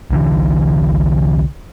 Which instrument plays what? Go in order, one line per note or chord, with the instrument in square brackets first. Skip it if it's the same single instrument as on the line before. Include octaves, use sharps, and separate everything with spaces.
[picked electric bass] C2 D3 E3